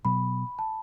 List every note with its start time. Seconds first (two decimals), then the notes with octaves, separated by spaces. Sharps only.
0.05 B2 F#3 B3 B5
0.59 A5